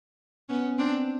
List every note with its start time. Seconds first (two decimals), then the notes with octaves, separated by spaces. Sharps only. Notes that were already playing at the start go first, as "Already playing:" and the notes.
0.49 B3 C#4
0.78 C4 D4